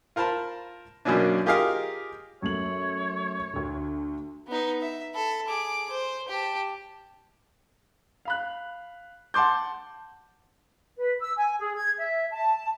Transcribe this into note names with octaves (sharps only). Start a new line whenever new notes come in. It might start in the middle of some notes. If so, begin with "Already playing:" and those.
F4 A#4 C5 A5 B5
F#2 B2 F#3 A#3 C#4 D4
F4 G4 G#4 A#4 D#5 F5
F#2 A3 C#5 F#7
D2 D3
B3 D#4
E5
A4 B5
G#4 D6
C5
G4 A5
F5 B5 F#6
F#5 A5 C6 D6 G6
B4
E6
G#5
G#4
G#6
E5
A5